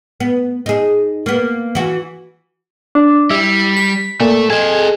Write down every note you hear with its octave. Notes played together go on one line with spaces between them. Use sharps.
B3
D#4 G#4
A#3 B3
E3 F#4
D4
G3 E4
B6
A#2 A3 A4
G#4 A4 D#5